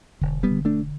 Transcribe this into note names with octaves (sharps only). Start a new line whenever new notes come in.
E1 D3
G3 B3
D3
A3 D4